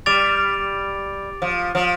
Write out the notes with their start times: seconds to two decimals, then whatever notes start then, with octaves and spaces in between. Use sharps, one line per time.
0.06 G3 D6 A6 D7 F7
1.42 F3
1.75 F3